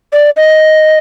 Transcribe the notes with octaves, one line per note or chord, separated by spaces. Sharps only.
D5
D#5